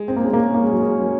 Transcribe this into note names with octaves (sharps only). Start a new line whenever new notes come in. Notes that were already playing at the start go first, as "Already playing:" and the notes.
Already playing: G#3
C4
A#3
G#3 C#4
A#3
A#3
G#3
F#3
G#3
F#3